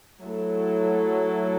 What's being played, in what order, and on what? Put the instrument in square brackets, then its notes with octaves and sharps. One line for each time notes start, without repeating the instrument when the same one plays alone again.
[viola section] F#3 A3 E4 A4